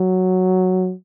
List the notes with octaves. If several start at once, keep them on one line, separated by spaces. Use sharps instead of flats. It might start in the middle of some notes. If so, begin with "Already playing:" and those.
Already playing: F#3